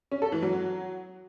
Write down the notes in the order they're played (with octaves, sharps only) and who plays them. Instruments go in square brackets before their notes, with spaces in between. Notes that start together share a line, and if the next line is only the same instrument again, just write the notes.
[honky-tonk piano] C#4
A4
E3
F#3